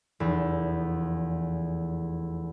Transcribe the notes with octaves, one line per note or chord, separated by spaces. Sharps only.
F1 E2